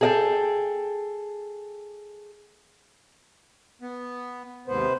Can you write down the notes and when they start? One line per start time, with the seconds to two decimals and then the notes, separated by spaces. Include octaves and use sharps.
0.01 G#4 A4 D#5 F#5 G5 A5
3.82 B3
4.68 D#2 G#2 C3 B3 B4 C5